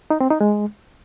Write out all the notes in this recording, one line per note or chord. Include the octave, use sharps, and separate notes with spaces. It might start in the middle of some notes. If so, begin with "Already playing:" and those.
D#4
C4
D#4
G#3